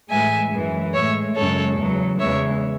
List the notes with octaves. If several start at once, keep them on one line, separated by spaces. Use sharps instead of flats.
A2 E3 G#3 E5 G#5
F#2 E3 G#3
A2 G#3 C#5 E5
F#2 C#3 G#3 A4 C#5
E2 C#3 F#3
E2 C#3 E3 G#3 C#5 E5